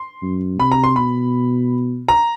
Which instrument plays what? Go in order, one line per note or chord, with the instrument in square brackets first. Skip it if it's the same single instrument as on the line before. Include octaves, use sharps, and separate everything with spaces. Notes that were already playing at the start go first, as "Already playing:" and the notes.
Already playing: [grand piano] C6
[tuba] F#2
[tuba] C3 [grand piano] B5
[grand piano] A#5
C6
[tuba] B2 [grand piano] B5
[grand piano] A#5